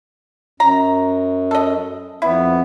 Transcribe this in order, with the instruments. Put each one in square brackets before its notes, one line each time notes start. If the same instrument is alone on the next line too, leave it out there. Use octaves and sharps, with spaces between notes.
[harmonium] F#2 [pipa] A#5
[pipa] A4 D#5
[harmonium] F2 B3 [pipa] E4